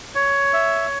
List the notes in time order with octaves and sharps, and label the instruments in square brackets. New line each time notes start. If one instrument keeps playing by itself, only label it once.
[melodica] C#5
E5